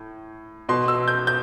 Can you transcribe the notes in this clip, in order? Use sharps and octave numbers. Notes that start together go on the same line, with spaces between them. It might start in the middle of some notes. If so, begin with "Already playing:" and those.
Already playing: A2
B2 C6
E6
G6
G6